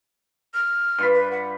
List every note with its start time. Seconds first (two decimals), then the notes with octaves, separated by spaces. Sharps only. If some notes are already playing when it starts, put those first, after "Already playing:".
0.54 F6
0.99 G2 F4 B5
1.14 B4
1.31 F#5